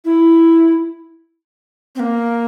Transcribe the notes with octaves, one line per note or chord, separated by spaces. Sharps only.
E4
C4
A#3